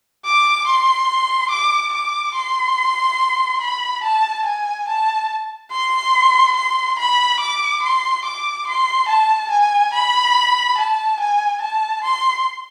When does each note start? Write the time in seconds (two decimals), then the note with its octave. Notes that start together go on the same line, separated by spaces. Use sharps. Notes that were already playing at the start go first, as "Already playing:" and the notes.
0.25 D6
0.67 C6
1.50 D6
1.93 D6
2.34 C6
3.61 B5
4.03 A5
4.45 G#5
4.88 A5
5.71 C6
6.56 C6
6.98 B5
7.40 D6
7.82 C6
8.24 D6
8.67 C6
9.08 A5
9.51 G#5
9.93 B5
10.78 A5
11.20 G#5
11.61 A5
12.03 C6